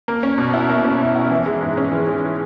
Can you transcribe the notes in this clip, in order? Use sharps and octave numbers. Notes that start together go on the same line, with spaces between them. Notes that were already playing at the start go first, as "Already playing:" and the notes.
A#3
C#4
B2
E4
A#3
C#4
B2
E4
E3
G#3
G#2
C#4
E3
G#3